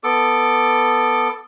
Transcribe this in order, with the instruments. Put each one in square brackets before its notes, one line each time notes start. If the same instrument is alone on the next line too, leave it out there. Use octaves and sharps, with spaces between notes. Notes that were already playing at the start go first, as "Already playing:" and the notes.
[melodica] B3 A4 D6